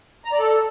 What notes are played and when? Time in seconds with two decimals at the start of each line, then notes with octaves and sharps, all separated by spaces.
0.25 A#5
0.32 D5
0.39 A4